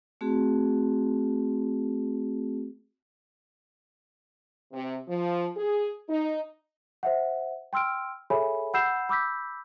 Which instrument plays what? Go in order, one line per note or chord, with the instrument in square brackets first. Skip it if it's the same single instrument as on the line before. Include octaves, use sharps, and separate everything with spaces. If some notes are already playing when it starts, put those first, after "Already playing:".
[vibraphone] A3 C4 F#4 G#4
[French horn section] C3
F3
G#4
D#4
[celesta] C5 E5 F#5
G5 C6 E6 F6 D7
G#4 A4 C#5 E5 G#5 B5
F#5 B5 E6 G6 C7 E7
B5 D6 E6 G6 B6